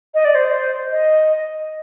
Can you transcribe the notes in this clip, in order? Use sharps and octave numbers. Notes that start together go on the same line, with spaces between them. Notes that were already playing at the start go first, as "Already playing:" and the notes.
D#5
D5
C5
D#5